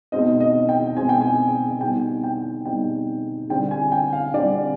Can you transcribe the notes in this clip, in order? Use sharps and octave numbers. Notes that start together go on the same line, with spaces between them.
B2 G#3 C4 D#4 D#5
D#5
G5
B2 G#3 C4 D#4 G#5
G5
G#5
B2 G3 C4 D#4 G5
G5
B2 G3 C4 D#4 G5
D3 G3 C4 G5
G#5
G5
F5
D3 G3 C4 D5